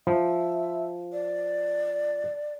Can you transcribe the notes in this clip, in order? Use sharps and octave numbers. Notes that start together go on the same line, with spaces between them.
F3 E5
D5